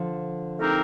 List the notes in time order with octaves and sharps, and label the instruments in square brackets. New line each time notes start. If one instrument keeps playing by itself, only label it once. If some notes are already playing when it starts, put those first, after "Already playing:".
Already playing: [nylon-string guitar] D3 F3
[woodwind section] A3 C4 D#4 G4 A#4